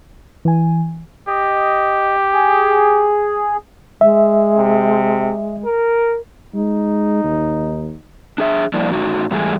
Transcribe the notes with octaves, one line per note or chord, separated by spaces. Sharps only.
E3 G#5
G4 D#5
G#4
G#3 E5
C3
A#4
G#3 D#4
D#2
D4 G#4 E5
F3 G3 A#3 D4 E4 D5
A2 D#4 F#4
G#2 E3 G3 A3 G#4 G#5